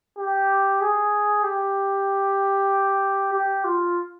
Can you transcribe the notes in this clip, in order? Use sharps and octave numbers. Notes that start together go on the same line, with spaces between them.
G4
G#4
G4
G4
F4